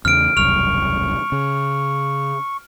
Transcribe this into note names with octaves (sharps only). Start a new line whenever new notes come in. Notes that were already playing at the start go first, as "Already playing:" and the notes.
E2 C#3 A3 F6 D7
E1 C2 F#2 C#6 F6 F7
C#3